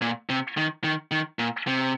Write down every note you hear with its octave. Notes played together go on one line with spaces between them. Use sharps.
A#2
C3
D#3
D#3
D#3
A#2
C3